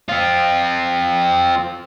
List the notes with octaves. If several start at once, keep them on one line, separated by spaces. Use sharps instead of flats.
C4 F4